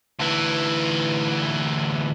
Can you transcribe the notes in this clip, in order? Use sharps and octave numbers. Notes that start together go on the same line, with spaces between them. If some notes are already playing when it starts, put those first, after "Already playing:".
D2 E3